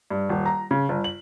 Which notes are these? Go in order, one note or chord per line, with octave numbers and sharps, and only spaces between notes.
G2
D#1
A#5
C#3
G1
F#7